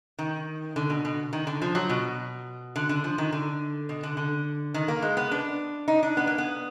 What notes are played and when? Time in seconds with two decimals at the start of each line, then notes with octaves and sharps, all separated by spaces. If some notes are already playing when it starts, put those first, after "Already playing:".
0.19 D#3
0.76 D3
0.90 B2
1.05 B2
1.33 D#3
1.47 D3
1.62 F3
1.75 F#3
1.89 B2
2.76 D3
2.89 D3
3.04 F3
3.18 D#3
3.32 D3
3.89 B2
4.03 D3
4.17 D3
4.74 D#3
4.88 A#3
5.02 G#3
5.17 B3
5.31 D4
5.88 D#4
6.03 D4
6.17 B3
6.27 A#3
6.38 B3